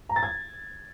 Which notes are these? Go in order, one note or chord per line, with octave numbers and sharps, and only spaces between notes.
A#5
A6
G#6